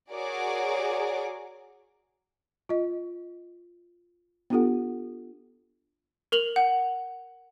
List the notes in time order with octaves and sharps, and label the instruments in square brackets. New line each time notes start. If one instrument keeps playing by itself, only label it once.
[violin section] F#4 G#4 A#4 C#5 D5 D6
[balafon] F4 D#5
B3 D4 F4 G4 A4 F#5
[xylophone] A#4 F7 F#7
F#5